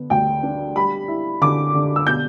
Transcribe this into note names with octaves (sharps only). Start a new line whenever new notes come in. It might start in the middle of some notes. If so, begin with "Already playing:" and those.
Already playing: D3 B3
D2 G5
D4
G3 B5
E4
D3 D6
D3
E6
B2 G6